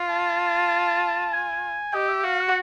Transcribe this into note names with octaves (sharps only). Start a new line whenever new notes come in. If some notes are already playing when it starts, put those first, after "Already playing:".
Already playing: F4
A5
G#5
G4 D#5
E5
F#4 F5
F#5